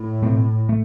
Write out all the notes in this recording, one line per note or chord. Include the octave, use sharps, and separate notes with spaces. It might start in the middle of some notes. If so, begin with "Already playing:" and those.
Already playing: A2
B2 A3 C4
A3